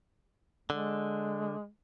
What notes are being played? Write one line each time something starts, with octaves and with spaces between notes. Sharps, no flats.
D3 G#3